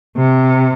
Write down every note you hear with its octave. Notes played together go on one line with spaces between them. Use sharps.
C3